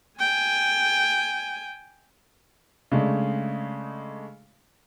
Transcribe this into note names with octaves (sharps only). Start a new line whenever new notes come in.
G5 G#5
C#3 G#3 A3 D4